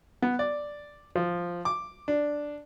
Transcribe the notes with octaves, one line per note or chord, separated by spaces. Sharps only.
B3
D5
F3
D6
D4